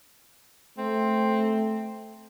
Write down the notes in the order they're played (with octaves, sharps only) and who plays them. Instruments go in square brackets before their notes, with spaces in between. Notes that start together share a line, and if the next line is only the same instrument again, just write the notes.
[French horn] A3 [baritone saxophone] C4